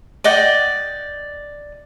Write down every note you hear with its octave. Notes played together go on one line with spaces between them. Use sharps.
D5 D#5 F#5 G5